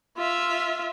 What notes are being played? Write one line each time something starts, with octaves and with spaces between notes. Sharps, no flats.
F4 E5